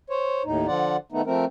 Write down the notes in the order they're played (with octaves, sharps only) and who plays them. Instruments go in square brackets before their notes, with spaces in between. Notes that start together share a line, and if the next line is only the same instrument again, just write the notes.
[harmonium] C5 C#5
D#2 A2 D#4
D3 F3 F4 D5 F#5
D#3 A3 B3 D#4
F3 A3 C4 A#4